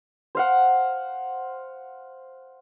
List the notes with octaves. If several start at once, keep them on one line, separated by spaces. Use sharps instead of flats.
C5 F5 F#5